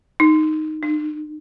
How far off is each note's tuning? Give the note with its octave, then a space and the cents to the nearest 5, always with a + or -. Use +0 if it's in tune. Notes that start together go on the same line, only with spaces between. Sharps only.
D#4 -5
D#4 -45